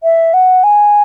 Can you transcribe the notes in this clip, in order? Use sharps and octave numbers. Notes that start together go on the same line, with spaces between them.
E5
F#5
G#5